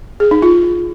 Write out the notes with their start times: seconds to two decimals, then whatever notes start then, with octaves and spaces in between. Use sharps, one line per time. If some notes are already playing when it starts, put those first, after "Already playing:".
0.20 G#4
0.31 D#4
0.42 F4